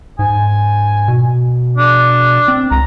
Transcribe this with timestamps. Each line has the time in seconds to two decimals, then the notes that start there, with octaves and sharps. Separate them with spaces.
0.19 G#2 G#5
1.08 B2
1.78 D4
2.48 C4
2.71 C#2 A#5